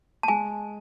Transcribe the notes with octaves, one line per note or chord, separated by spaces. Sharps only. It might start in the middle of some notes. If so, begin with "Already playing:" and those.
A5
G#3 G#5